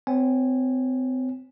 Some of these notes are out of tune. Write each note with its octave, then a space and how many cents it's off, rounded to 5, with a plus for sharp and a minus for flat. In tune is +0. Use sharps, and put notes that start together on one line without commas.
C4 -35 C#5 -5 G#5 -15